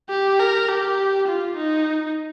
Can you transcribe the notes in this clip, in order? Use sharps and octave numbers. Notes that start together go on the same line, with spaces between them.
G4
A#4
G4
F4
D#4